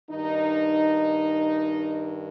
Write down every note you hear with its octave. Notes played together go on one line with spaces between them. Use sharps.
G2 D#3 D#4